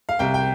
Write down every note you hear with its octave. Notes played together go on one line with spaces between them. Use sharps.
F5
C2 G5
G5